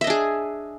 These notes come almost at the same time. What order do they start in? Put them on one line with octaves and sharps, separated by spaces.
E5 D#5 D4 G#4